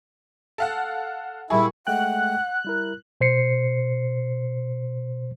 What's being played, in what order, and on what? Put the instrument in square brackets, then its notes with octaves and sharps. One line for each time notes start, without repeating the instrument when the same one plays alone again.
[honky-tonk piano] A4 F5 F#5
[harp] A#2 G3 C#6 [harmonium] E4 [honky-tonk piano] G#4
[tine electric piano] G#3 A3 G5 [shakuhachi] F#5 [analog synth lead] F#6
[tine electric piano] G3 E4 A#4
B2 C5 C7 C#7